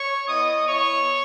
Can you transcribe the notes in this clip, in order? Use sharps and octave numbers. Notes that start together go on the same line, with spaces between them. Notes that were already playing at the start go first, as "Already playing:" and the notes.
Already playing: C#5 C#6
B3 E4 D#5 D#6
B3 E4 C#5 C#6